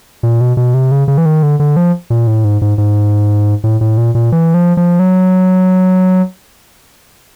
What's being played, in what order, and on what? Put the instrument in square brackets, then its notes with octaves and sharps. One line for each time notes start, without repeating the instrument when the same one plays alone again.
[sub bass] A#2
B2
B2
C3
C#3
C#3
E3
D#3
D3
D3
F3
A#2
A2
G#2
G#2
G#2
A2
A2
A#2
A#2
E3
F3
F3
F#3